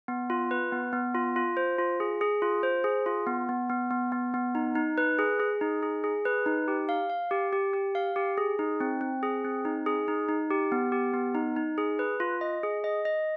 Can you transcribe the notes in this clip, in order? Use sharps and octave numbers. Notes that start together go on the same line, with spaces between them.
B3
F4
B4
B3
B3
F4
F4
C5
F4
G#4
G#4
F4
C5
G#4
F4
B3
B3
B3
B3
B3
B3
D#4
D#4
B4
G#4
G#4
D#4
G#4
G#4
B4
D#4
G4
F5
F5
G4
G4
G4
F5
G4
G#4
D#4
C4
C4
G#4
C4
D#4
G#4
D#4
D#4
G4
B3
G4
B3
D#4
D#4
G#4
B4
F4
D#5
G#4
D#5
D#5